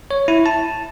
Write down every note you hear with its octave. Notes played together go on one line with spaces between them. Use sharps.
C#5
E4
A5